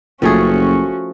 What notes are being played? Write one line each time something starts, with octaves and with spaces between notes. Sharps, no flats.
F#1 F3 A3 C#4 F#4 G#4